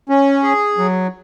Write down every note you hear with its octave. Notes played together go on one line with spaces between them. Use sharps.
C#4
G#4
F#3